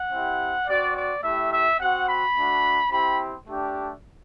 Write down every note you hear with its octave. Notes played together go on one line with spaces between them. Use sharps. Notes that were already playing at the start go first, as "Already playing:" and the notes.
Already playing: F#5
C4 E4 G4
C4 F#4 D5
D5
A3 E4 G4 E5
E5
C4 F#4 F#5
B5
A3 D4 F#4
C4 E4 G4 B5
A3 D4 G4